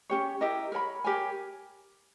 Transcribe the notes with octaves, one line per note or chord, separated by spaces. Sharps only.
C#4 G4 C#5
E4 G4 A#4 D#5
A#4 C#5 G#5 B5
G4 A#4 C#5 G#5